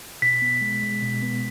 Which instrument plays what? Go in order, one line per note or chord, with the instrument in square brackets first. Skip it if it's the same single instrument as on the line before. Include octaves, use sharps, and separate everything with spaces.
[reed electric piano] B2 [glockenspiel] B6
[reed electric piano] B3
G#3
G#3
B2
B3